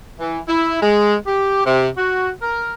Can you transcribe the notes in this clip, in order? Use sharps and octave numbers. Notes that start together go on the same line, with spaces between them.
E3
E4
G#3
G4
C3
F#4
A#4